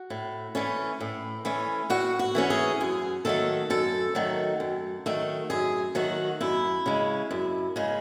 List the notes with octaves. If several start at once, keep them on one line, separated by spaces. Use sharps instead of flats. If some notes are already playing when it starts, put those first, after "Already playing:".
Already playing: F#4
A2
E3 A3 C#4
A2
E3 A3 C#4
A2 F#4
F#4
E3 A3 C#4
G#4
F#2 G#4
D#3 F#3 A3 A4
F#2 A4
D#3 F#3 A3
F#2
D#3 F#3 A3
F#2 G#4
D#3 F#3 A3 F#4
F#2 E4
C#3 G#3
F#2
C#3 G#3